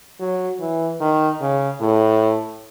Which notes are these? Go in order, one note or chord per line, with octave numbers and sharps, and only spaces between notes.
F#3
E3
D#3
C#3
A2